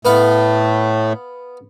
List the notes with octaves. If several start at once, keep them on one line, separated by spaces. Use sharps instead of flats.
A2 A3 B3 B4 F5